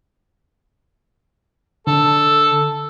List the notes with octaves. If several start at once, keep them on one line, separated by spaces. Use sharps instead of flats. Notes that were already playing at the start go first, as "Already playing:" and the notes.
D3 A4